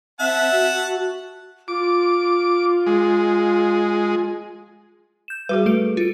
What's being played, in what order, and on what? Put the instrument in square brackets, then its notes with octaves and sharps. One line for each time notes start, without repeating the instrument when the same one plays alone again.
[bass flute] C4 [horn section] E5 [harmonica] F#5 A5
[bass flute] F#4
[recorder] F4 [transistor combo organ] D6
[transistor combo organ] G#3
[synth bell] G6 E7
[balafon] G3 F#4 G#4 [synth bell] B4
[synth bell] A3 A4 D7
F4 D7